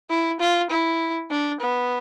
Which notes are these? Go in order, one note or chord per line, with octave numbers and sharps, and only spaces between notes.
E4
F4
E4
D4
B3